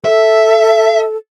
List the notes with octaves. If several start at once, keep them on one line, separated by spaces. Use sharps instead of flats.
A4 E5